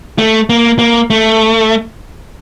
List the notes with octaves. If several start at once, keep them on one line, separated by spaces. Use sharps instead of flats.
A3
A#3
A#3
A3